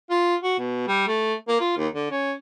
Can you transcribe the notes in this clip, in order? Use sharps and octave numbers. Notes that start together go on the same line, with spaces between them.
F4
F#4
B2
G3
A3
A#3
F4
D#2
D3
C#4